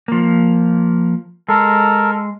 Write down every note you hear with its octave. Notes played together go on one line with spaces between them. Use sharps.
F3 A#3
G#3 A4 A#4